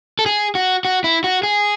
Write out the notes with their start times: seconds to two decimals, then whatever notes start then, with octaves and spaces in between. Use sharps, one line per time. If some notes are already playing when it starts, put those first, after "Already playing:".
0.19 A4
0.26 G#4
0.55 F#4
0.85 F#4
1.04 E4
1.24 F#4
1.43 G#4